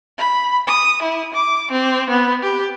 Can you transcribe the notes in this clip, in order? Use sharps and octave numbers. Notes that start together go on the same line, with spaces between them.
B5
D#6
E4
D6
C4
B3
G4